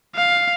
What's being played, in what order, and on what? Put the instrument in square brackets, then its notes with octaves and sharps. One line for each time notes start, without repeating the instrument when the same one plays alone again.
[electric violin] F5